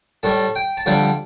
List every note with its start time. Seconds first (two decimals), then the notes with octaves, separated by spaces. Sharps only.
0.23 A2 G3 A5
0.55 G5
0.77 A5
0.86 F2 D3 G3 G5